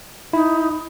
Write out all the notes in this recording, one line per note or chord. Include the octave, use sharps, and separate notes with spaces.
D#4 E4